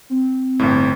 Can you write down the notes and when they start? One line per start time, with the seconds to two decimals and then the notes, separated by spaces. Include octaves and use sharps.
0.10 C4
0.59 G1 A2